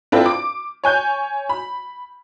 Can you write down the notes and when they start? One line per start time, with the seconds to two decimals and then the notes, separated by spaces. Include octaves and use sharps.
0.12 C4 D4 E4 F4 A4 B4
0.26 D6
0.84 C#5 G#5 G6
1.49 B5